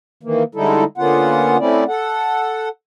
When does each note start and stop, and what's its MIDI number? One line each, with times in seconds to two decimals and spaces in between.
0.23 0.43 51
0.23 0.43 52
0.23 0.43 58
0.55 0.84 50
0.55 0.84 55
0.55 0.84 56
0.55 0.84 63
0.55 0.84 64
0.55 0.84 69
0.98 1.57 50
0.98 1.57 58
0.98 1.57 59
0.98 1.57 61
0.98 1.57 65
0.98 1.57 78
1.60 1.84 57
1.60 1.84 60
1.60 1.84 61
1.60 1.84 64
1.60 1.84 74
1.88 2.69 69
1.88 2.69 78